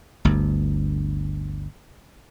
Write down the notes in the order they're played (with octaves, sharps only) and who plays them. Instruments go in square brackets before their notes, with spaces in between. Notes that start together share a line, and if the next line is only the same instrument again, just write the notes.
[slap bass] G1 D2